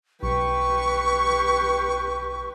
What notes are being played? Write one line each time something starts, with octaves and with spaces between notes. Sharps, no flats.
B1 G4 B4 C#6